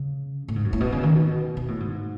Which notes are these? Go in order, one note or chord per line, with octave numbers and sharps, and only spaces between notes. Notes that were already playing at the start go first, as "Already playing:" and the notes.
Already playing: C#3
A2
G#2
F#2
A2
B2
C#3
D#3
B2
B2
A2
G#2